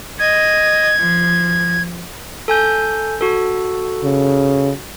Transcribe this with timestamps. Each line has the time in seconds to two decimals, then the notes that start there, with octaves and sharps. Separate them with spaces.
0.19 D#5 G#6
0.98 F3
2.48 A4 G#5 G6
3.21 F#4 A4
4.04 C#3